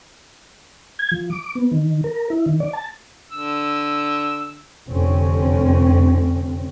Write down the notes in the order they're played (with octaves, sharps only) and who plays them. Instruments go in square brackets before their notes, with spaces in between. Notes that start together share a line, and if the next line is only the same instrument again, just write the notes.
[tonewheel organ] G#6
F3
D6
B3
D#3
A#4
E4
D#3
D5
A5
[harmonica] D3 E6
[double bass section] F1 F2 D3 C4 C#4